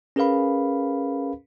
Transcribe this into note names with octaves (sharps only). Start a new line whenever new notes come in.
C#4 G#4 A#4 B4 F5 B5